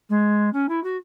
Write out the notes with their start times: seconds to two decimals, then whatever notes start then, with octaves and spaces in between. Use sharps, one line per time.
0.09 G#3
0.53 C#4
0.69 E4
0.83 F#4